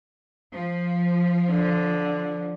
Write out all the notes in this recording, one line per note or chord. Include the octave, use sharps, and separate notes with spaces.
F3
D3